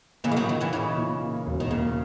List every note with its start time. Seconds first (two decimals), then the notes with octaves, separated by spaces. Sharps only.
0.24 C#3 E3 A#3
0.31 G#3
0.36 D#3 F#3
0.49 A#2 D#3
0.61 C#3 E3
0.73 C#3 E3 D#4
0.97 A#2
1.22 A#3
1.46 E1
1.60 D#3
1.71 C#3 A#3